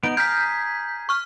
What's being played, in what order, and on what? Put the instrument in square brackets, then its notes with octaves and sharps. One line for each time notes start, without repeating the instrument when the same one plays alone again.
[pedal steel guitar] B3 D#4 [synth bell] D7
[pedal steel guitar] G#4 A#5 F6 [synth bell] G6 B6
[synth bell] C#6 F6